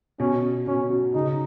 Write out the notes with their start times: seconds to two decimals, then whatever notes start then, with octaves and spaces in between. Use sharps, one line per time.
0.20 B2 C#4
0.67 B2 C#4
0.90 F#3
1.14 C#3 D#4